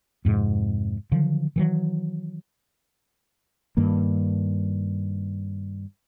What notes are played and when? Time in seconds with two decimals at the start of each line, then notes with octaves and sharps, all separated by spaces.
0.25 F2 G#2 C3
1.12 D3 D#3 F3 F#3
1.56 D#3 E3 F#3
3.77 G2 D#3 A#3